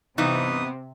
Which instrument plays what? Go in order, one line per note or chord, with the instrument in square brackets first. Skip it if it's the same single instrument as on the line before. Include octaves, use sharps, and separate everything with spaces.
[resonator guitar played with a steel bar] G2 E3 D#4 [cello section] C3 [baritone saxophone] B3